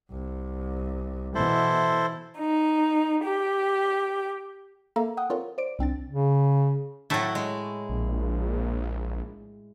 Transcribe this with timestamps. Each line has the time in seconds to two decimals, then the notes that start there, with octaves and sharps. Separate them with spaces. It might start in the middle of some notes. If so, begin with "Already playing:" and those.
0.10 C2
1.35 B2 E3 E4 A4 C5
2.38 D#4
3.23 G4
4.96 A#3 A4 E5 A#5
5.17 F#5 G5 D#6
5.30 C4 F4 A4 A#4 C#5
5.58 C5 D5 D7
5.79 C2 C4 D4 A6
6.08 C#3
7.10 A2 F#3 A3 E4 A5
7.35 G#3
7.89 A#1